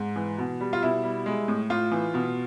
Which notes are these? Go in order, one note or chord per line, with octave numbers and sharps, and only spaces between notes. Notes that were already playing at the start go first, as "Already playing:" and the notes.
Already playing: G#2
E3
B2
G3
F4
B2 E4
G3
G#3
A2
A2 F4
E3
B2